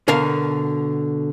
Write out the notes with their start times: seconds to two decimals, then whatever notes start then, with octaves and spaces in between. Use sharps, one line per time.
0.08 B2 D3 A#4 F5